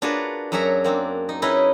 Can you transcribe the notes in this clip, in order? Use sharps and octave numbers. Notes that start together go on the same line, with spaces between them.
D4 F4 F#4 G#4 A#4 B4
F#2 F#3 F#4 G#4 E5 A#5
A#3 C4 D4 G#4
D#4
C#4 D#4 E4 G#4 B4 D#5